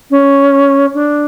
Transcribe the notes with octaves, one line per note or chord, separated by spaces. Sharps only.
C#4
D4